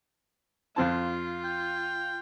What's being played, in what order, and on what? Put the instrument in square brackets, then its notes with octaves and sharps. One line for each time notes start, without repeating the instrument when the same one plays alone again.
[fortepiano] F2 C4 A5 [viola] F4
[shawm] G5